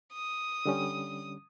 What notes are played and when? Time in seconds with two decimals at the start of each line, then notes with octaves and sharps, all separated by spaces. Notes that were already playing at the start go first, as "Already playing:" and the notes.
0.13 D#6
0.66 D3 G3 C#4